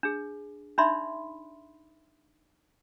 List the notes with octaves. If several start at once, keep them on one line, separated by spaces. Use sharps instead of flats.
D4 G#4
D4 D#4 D5 E5 B5 C6